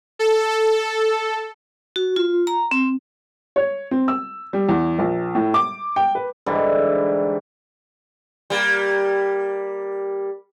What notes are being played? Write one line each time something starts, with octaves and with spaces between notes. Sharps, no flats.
A4
F#4
F4
A#5
C4
C#5
C4
E6
G3
E2
A#1
A2
D6
G5
B4
G#2 D3 E3 G3
G3 A#3